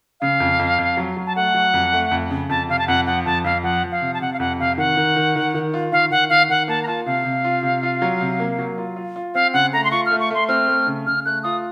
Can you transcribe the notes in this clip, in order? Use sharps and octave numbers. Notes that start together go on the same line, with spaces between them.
C#3 F5
F2
F2
F2
F#3
F#3
A5
A3 F#5
F#3
F2
A3
F2
C#3
F2 A5
C3 F5
A5
F2 F#5
F3 F#5
F2 A5
F2 F5
F3 F#5
F3
F5
C3
A5
C3 F#5
F5
F2 F#5
C3 F5
D#3 F#5
D#3
D#3
D#3
D#3
F4
D#3 F5
D#3 F#5
D#3 F5
D#3 F#5
A#3 A5
A#5
F4 A5
C3 F5
C3
F4
C3
F4
F#3
C3
A#3
F#3
F4
F4
F4
C4 F5
C#3 F#5
A3 A#5
C6
F4 C#6
F6
A3
C#6
A3 C6
C4 F6
A3
C#3
C#3 F6
A3 F#6
F4 D#6